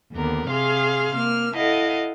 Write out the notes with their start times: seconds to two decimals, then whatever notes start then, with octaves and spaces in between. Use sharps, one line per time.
0.12 D#2 D3 B3 A#4
0.49 C3 G#4 F5 C6 F6
1.14 A#3 F6
1.56 E4 A4 D#5 F5 F#5